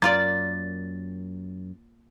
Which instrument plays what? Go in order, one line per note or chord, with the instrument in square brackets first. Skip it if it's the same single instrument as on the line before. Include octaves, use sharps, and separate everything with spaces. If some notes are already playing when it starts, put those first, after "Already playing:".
[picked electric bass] F#2 [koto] A#3 F4 D5 [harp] A6